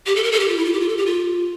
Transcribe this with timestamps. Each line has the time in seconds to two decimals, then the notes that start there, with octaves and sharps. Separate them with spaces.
0.06 G4
0.16 A4
0.23 A#4
0.32 A4
0.40 G4
0.48 F4
0.56 E4
0.65 F4
0.73 G4
0.80 F4
0.88 A4
0.97 G4
1.06 F4